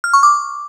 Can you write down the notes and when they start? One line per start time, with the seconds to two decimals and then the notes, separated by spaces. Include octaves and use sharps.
0.04 F6
0.13 C#6
0.23 D6